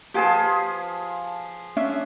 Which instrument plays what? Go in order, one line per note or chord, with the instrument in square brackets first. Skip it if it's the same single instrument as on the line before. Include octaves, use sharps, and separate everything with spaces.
[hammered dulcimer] F3 G#4 [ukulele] G4 B4 A5
[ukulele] C#4 D4 E5